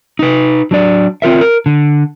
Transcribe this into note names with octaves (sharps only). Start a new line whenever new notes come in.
D#4 B4
F#3 D4 D5
C4 F4 A#4 E5
A#4
D3